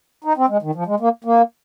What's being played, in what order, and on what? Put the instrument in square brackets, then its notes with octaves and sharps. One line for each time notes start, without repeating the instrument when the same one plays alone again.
[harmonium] D#4
C4
G#3
D#3
F3
G#3
A#3
A#3